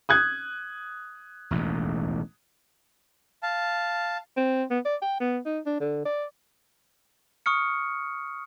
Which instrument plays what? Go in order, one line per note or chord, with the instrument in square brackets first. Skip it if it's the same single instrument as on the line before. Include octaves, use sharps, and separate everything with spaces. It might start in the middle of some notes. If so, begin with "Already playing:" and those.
[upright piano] D#6 F#6 G#6
[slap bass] E1 A1 D#2
[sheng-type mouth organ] F5 A5
[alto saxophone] C4
B3
D5
G5
B3
D#4
D4
D3
D5
[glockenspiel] C#6 D#6 F6 C#7